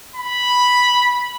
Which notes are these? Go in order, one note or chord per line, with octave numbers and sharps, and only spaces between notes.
B5